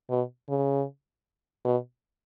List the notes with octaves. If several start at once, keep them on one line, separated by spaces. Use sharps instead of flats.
B2
C#3
B2